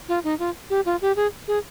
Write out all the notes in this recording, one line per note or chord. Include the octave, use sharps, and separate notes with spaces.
F4
D#4
F4
G4
F4
G4
G#4
G#4